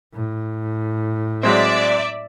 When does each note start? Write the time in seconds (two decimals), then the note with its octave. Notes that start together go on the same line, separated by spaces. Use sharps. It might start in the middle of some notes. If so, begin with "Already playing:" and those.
0.14 A2
1.43 F#3 G#3 C4 D5 E5